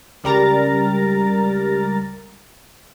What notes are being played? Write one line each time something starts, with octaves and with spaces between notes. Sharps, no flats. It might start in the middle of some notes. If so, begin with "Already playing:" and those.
C#2 G3 A#4 A#5 A6